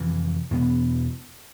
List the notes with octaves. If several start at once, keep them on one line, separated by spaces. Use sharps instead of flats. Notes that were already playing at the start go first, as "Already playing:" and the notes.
Already playing: F1 F2 E3
E2 B2 B3